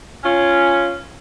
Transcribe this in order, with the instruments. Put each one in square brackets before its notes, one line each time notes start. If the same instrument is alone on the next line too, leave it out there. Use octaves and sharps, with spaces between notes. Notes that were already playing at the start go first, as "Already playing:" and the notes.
[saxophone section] C#4 F4